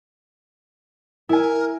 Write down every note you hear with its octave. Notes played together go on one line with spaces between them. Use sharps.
E4 A#4 G#5